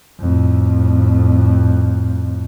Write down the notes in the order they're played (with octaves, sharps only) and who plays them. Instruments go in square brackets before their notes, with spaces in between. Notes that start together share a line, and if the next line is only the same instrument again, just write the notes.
[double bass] F2 A2